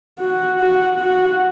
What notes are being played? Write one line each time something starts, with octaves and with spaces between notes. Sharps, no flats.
F#4
F#4
F#4